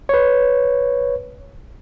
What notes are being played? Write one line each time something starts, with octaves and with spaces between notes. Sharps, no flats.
B4 C#5